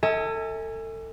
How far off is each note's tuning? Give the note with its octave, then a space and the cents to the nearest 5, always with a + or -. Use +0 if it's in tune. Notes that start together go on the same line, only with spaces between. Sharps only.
A4 +30 E5 -45 G#5 -10